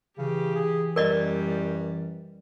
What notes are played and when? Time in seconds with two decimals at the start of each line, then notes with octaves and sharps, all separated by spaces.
0.18 C#3 E3 G4
0.56 G#4
0.96 F#2 G3 A#4 D5 D#5